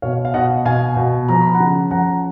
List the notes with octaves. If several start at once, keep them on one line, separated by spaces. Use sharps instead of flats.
B2 C#5 F5
F5
B2 D#5 F#5
B2 F5 G#5
B2
F3 A#5
B5
F#5 A#5
C#3
F3 F#5 A#5